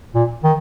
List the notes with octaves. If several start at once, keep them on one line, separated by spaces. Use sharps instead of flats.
A#2
D#3